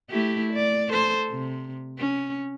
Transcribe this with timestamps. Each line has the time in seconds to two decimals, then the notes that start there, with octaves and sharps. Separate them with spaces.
0.10 A3 E4 G4
0.53 D5
0.89 A4 C5
1.29 C3
1.98 C#4